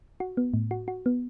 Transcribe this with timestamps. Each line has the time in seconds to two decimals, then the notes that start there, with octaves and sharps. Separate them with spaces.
0.20 F#4
0.37 B3
0.54 A2
0.71 F#4
0.88 F#4
1.06 B3